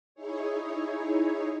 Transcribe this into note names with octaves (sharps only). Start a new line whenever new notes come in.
D#4 E4 G#4 C#5